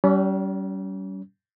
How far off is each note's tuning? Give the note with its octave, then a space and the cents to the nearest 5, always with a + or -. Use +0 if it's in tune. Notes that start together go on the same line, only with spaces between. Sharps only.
G3 -35 C#4 +30